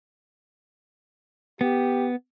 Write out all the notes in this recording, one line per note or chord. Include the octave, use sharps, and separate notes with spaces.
B3 G4